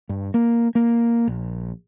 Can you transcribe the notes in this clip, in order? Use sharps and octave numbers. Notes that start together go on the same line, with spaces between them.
G2
A#3
A#3
A#1